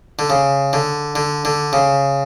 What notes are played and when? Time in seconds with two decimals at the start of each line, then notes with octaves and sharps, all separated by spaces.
0.19 D3
0.30 C#3
0.73 D3
1.15 D3
1.45 D3
1.73 C#3